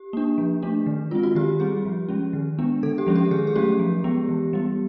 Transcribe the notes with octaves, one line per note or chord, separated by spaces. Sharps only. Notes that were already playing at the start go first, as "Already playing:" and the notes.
Already playing: G4
A#3 D4
F3
A3 D4
D#3
G#3 C4 F4
F#4
D#3 G4
G3 C4 G#4
F3
G#3 C#4
D#3
G#3 B3 D4
D3 A4
G4
F3 G#3 C#4
G4
D#3 G#4
G#4
F#3 A3 C#4 G4
F3
G#3 B3
E3
G3 B3